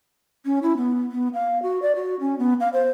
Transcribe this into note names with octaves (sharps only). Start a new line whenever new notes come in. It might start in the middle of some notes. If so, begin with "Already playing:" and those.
C#4
E4
B3
B3
F5
F#4
D5
F#4
C#4
B3
F5
C5